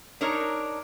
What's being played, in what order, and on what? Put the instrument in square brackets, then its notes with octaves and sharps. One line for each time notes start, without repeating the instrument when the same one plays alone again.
[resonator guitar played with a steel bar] D4 D#4 A#4 C#5